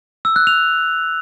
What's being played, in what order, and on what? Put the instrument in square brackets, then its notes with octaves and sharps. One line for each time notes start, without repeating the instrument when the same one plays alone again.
[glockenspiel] E6
F#6
F7